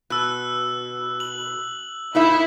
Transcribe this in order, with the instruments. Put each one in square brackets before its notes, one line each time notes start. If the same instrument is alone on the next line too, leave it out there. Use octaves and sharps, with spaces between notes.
[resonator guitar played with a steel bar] B2 [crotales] E6 F#6
[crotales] F#7
[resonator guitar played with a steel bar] A#2 D#4 E5 [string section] E4